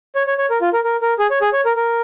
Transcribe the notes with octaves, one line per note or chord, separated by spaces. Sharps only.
C#5
C#5
C#5
A#4
F4
A#4
A#4
A#4
G#4
C#5
G#4
C#5
A#4
A#4